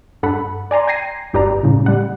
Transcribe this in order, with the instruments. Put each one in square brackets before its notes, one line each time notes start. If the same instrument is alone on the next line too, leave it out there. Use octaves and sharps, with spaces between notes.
[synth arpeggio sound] G2 A4 F#5 B5
D5 G#5 A#5 C6
G5 G#6 A#6 C7 D#7
G1 G2 G4 B4 D5 A#5
A2 C#3 G3
G3 F#5